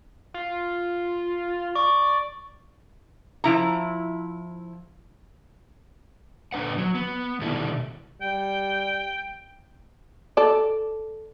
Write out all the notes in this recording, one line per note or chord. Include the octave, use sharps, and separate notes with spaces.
F4
D5 C#6
F3 E4 A#5
A#2 D3 D4 B4 F#5
F#3
B3
B2 D3 D#3 G3 D4 E4
G3 G5
A4 D5